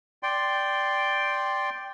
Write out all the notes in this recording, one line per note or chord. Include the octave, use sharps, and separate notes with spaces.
D5 G5 C6